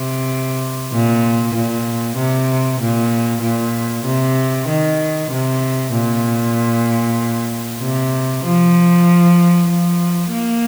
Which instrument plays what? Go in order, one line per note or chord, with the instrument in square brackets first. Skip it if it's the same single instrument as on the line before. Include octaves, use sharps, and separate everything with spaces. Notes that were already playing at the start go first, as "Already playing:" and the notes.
Already playing: [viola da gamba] C3
A#2
A#2
C3
A#2
A#2
C3
D#3
C3
A#2
C3
F3
F3
A#3